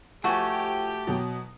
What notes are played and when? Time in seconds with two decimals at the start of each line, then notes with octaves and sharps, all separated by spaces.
0.24 F3 A3 F#4 G4 G#5
1.07 B2 F#3